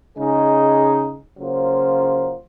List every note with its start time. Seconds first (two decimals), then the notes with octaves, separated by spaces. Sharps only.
0.18 C#3 G#3 D#4 G#4
1.37 C#3 F#3 A#3 F4 C5